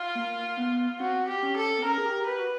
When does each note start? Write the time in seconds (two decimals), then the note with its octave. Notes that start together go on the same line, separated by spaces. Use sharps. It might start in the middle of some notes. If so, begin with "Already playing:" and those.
Already playing: F4
0.15 A#3
0.57 B3
1.00 C4 F#4
1.28 G4
1.43 C#4
1.56 A4
1.78 C4
1.84 C#4 A#4
1.98 G#4
2.05 G4
2.26 G4 B4
2.39 F#4